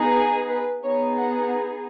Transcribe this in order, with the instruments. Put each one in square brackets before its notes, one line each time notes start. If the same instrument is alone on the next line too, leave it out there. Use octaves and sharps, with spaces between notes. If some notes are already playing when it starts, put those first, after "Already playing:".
Already playing: [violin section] B3 D#4 G#4
G#5
B4
B3 D#4 G#4 C#5
F#5